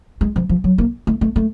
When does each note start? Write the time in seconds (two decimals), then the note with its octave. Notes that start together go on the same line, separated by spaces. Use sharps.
0.21 G#3
0.36 F3
0.49 F3
0.64 F#3
0.78 A#3
1.07 A3
1.21 A3
1.36 A3